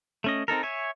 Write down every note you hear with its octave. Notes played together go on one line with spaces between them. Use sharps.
A3 C#4 D#5
C4 D#4 A4 A#4
C#5 E5 G#5